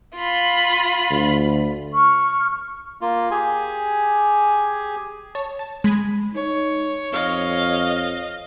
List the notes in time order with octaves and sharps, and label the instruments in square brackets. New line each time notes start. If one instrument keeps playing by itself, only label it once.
[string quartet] F4 B5
[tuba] D2
[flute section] C#6 F6
[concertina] A#3 F4
G4 G#4 G#5
[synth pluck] C#5 A5
A5
G#3 B5 G#6 D#7
[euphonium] D#4 [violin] C#5
[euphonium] F2 [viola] D#5 F5